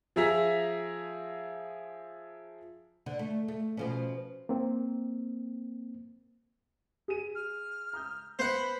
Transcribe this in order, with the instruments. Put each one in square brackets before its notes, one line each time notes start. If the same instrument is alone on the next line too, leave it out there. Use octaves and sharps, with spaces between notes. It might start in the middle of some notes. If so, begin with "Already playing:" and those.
[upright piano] F3 G#4 E5 A#5 B6
[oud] D3
A3
A3
B2 F3 C#4
[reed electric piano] A#3 C4
[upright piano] G#4 D#7
[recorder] F6
[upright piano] A#5 D#6 G6
[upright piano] B3 [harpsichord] C5 F#5 [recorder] B5